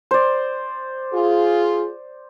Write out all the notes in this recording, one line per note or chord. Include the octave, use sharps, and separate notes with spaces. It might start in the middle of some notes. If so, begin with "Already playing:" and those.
C5 D5
F4 G#4